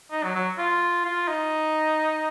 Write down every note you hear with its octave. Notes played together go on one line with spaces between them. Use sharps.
D#4
F#3
F#3
F4
F4
D#4